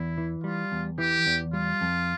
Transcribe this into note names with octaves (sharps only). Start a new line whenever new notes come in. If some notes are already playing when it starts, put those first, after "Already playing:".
Already playing: E2 E4
E3
G3 F4
E2
E3 G4
E2
G3 F4
F2